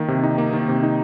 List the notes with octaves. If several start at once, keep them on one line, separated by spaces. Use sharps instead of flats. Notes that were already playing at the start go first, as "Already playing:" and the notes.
Already playing: D#3 A#3
C3
D#4
A#3
D#3
C3
D#4